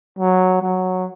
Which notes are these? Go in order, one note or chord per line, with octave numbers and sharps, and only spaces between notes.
F#3
F#3